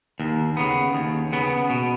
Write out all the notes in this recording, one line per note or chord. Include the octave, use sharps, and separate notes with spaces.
D#2
C#3 B3
D#2
C#3 B3
B2